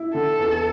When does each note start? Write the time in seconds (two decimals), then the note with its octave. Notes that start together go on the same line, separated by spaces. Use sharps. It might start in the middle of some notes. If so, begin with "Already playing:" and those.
Already playing: E4
0.14 D3 A4
0.39 E2